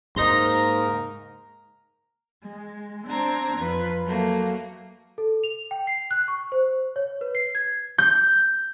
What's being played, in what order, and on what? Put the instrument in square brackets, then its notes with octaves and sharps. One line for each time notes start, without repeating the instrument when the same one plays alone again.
[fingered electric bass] G#2 [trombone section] A#3 A#4 [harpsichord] D#4 A#5 C6
[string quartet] G#3
C4 D4 A#5 G#6
F2 F4 B4
F#3 A3 A#3
[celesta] A4
F7
G5
C7
F#6
C#6
C5
C#5
B4
C7
G#6
[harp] G6